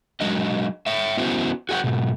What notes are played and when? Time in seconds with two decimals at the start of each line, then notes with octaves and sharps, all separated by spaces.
0.21 F#3 G#3 D4 D#5
0.86 C#5 E5
1.17 B3 C#4 E4 F#4 C5
1.69 F#4 G#4 C#5 F#5 G5
1.84 G#2 B2